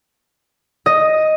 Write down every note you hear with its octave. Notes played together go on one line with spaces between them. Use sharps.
D#5